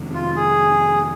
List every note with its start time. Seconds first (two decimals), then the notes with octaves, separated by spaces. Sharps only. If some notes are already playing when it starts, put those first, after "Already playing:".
Already playing: F2 C3 D#3 G#3
0.14 F4
0.36 G#4